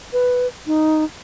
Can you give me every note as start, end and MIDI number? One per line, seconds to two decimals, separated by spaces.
0.13 0.47 71
0.67 1.04 63